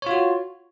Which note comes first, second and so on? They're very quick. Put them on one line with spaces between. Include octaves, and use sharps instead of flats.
C#5 F4 F#4